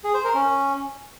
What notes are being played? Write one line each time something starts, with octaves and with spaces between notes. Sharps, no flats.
G#4
C5
A#4
C#4